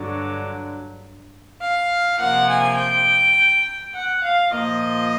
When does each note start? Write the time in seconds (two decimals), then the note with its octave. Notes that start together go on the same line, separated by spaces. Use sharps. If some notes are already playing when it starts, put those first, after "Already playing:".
Already playing: G2 D3 F#3
1.61 F5
2.19 C3 F3 A#3 F#5
2.48 G#5
2.77 G5
3.94 F#5
4.24 F5
4.52 A#2 F3 A#3 D#5